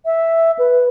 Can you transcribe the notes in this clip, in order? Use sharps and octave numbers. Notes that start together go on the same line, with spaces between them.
E5
B4